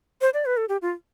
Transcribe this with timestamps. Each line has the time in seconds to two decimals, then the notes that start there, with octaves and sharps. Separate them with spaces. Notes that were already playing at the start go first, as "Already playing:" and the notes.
0.21 C5
0.34 D5
0.46 B4
0.57 A4
0.69 G4
0.82 F4